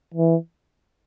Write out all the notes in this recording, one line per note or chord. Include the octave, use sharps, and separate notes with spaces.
E3